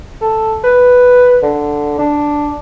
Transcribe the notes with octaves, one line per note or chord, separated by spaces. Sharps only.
A4
B4
D3
D4